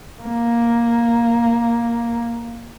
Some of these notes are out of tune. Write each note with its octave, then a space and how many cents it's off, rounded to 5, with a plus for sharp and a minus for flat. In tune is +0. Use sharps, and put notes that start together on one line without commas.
A#3 +5